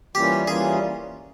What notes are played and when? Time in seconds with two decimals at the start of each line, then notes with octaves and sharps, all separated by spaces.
0.15 E3 G3 A#3 C#4 F4 G4
0.47 E3 G3 A#3 C#4 F4 G#4